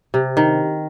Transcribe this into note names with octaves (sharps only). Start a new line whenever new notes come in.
C3
D#3